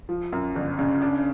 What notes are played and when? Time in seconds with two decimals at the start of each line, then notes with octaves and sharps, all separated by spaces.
0.09 F3
0.33 F#2
0.56 G1
0.79 C#3
1.02 D4